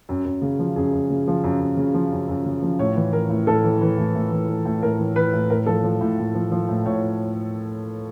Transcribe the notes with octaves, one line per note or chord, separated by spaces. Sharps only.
F#2
F#2
C#3
F3
F#2 G#4
F#2
C#3
F3
F#2
F#2
C#3
F3
F#2
F#2
C#3
F3
A2 C#5
E3
E3 A#4
A2
A2 A4
E3
E3
A2
A2
E3
E3
A2
A2 A#4
E3
E3 B4
A2
A2 A#4
F3 A4
F3
A2
A2
F3
F3
A2
A2 C#5